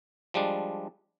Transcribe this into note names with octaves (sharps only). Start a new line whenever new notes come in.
F3 G3 G#3 D4